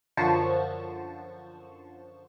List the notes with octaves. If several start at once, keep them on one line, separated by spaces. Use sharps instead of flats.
F#2 D3 F3 C5 A5 C#6